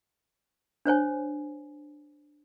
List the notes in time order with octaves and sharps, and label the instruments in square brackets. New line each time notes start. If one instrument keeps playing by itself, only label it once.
[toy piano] D4 C5 C#5 G#5